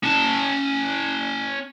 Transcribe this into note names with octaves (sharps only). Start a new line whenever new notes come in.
C#4 A5